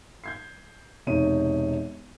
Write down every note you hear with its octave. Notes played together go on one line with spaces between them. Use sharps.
G6 G#6 C7
E1 C3 D#4 C#5 D#7